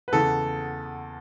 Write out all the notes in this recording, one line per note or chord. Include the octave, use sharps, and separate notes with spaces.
B4
E2 C#3 E3 B3 A4